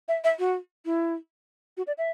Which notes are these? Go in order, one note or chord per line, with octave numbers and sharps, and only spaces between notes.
E5
E5
F#4
E4
F#4
D5
E5